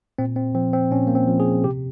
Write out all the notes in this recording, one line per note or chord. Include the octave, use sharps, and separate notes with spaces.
A#2 C4
C4
F3 C4
C4
A#2 C#4
A#3
C4
F3
G#4
C3 G4